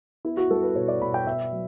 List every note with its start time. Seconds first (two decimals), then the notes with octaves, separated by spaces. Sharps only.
0.25 B3 E4
0.37 F#4
0.50 G3 A4
0.63 B4
0.76 B2 C#5
0.88 D5
1.02 B2 B5
1.14 G5
1.27 B3 E5
1.52 F#3